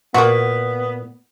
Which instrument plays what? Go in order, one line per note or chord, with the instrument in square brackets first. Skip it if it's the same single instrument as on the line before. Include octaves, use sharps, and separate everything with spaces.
[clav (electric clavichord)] A#2 [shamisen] A#3 F#4 [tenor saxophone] B3